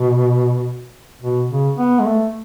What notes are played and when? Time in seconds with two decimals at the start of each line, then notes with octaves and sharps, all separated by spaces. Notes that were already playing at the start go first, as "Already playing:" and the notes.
Already playing: B2
1.21 B2
1.50 C#3
1.77 B3
2.00 G#3
2.06 A3